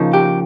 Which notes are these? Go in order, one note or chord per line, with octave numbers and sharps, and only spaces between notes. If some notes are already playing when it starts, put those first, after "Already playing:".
Already playing: C#3 F3 A#3 D#4
G4